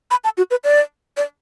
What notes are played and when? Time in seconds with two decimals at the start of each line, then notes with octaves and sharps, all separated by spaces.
0.11 B5
0.24 A5
0.37 F#4
0.51 B4
0.64 D5
1.17 D5